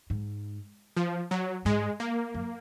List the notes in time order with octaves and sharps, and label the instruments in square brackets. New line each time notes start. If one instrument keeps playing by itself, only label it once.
[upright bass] G#2
[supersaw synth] F3
F#3
[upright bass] G#2 [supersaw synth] G#3
[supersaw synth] A#3
[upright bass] F#2